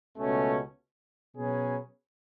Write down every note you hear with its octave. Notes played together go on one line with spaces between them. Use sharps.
C#2 B2 A3 C#4
B2 F#3 C#4 G#4 B4